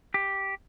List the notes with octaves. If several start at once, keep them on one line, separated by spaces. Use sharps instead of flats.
G4